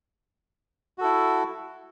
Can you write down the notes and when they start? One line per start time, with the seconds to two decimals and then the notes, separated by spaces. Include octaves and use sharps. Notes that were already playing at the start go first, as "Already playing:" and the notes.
0.98 F#4
1.01 A4
1.04 E4